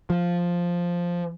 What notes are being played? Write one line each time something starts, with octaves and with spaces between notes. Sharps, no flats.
F3